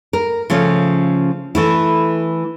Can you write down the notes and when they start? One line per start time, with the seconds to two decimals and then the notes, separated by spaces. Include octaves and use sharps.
0.13 A#4
0.50 C#3 F3 A3 C#4
1.55 E3 A3 E4